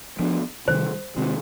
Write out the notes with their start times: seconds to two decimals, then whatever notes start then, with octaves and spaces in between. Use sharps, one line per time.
0.19 F3 B3 D4
0.68 C3 D#3 G3 C5
1.17 C3 D#3 G#3 C4